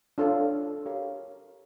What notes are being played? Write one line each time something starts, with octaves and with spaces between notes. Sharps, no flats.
D4 F4 A4 C#5 F5
G4 A#4 C#5 F5